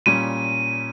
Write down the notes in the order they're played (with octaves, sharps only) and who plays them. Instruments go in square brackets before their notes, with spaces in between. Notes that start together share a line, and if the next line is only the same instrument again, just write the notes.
[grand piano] A#2 G3 C#4 [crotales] D#7